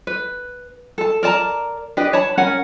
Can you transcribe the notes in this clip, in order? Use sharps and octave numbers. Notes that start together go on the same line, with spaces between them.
B4
A4 A5
A#4 D5 A5 A#5
D4 G4 B4 D#5
C#5 A5 B5
C#4 A#4 F#5